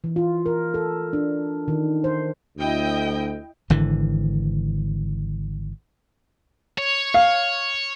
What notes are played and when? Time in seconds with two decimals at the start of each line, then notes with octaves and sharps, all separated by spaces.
0.04 E3
0.16 F4
0.46 A#4
0.74 A4
1.13 D4
1.68 D#3
2.04 C5
2.58 D2 E4 D#5 G5
3.70 G#1 D3 E3
6.78 C#5
7.14 F5